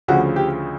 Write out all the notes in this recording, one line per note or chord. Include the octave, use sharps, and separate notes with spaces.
D2 C#3 F3 F#4
G4